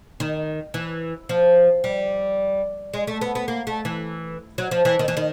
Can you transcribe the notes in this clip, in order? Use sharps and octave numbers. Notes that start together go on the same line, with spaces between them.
D#3
E3
F3
G3
G#3
A3
B3
B3
A#3
A3
E3
F#3
F3
E3
D#3
E3
D#3